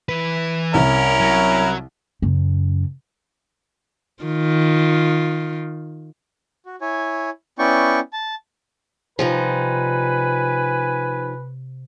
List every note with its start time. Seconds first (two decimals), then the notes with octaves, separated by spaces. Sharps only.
0.09 E3 B4
0.74 C2 C#4 E4 A#4
1.20 F#3
2.22 F#2 C#3
4.23 D#3 F4
6.65 F#4
6.81 E4 C#5 G#5
7.59 B3 C#4 E4 D5 G5 C#6
8.13 A5
9.19 C3 F3 G3 D#4 B4 G#5